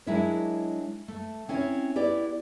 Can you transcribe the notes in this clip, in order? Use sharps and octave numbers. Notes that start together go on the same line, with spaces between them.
F#3 G#3 D4 E4 A#4 C#5
A3
C4 C#4 E4 C#5
B3 E4 G4 D5